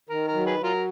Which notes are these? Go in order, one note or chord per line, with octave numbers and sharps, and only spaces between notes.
D#3 A#4
A#4
F#3
G#4 B4
F#3
F4 A#4